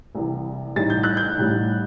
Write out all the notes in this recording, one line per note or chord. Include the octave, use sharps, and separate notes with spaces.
C2 C3 E3
A1 A2 G3 D#4 A6
G6
F#6
G6
A1 A2 G3 D#4